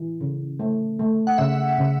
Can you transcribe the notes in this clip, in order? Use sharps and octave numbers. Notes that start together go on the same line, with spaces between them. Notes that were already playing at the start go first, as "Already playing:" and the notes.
Already playing: E3
C#3
A3
A3
F#5
C#3 E5
C#3